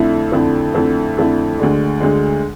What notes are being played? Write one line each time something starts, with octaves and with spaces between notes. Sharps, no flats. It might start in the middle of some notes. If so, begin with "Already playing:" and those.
Already playing: F2 D3 A3 E4
F2 D3 A3 E4
F2 D3 A3 E4
F2 D3 A3 E4
D2 D3 G#3
D2 D3 G#3